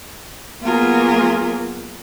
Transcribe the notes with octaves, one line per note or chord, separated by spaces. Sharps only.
F#3 A#3 B3 F4 G#4 A#4